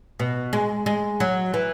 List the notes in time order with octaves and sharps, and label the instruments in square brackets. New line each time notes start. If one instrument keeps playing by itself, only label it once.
[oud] B2
G#3
G#3
F#3
E3